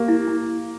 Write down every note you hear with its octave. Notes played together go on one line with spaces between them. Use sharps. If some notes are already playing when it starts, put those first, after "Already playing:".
Already playing: A#3 G4
E4
E4